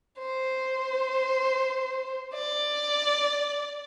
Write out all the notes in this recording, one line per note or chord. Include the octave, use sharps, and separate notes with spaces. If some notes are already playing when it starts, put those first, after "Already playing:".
C5
D5